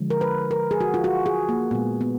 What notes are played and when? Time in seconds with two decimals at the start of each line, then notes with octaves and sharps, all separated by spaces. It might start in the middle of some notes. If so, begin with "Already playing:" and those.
Already playing: D3 F3 G#3
0.10 A#4
0.21 B4
0.51 A#4
0.71 G#4
0.81 F#4
0.94 F4
1.04 F#4
1.26 G#4
1.49 A#3
1.71 A#2 G#3 B3
2.01 B3